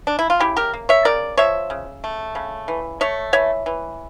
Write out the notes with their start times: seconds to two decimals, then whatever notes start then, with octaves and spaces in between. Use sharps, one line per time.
0.07 D4
0.19 E4
0.30 F4
0.40 C#3 E4 G4
0.56 G4 A#4
0.74 A#3
0.89 C#5 E5
1.05 C#3 A#4 D5
1.37 F3 C#5 E5
1.70 C#3
2.04 A3
2.35 C#3
2.68 E3
3.01 A3 C#5 E5
3.33 E3 C#5 E5
3.66 E3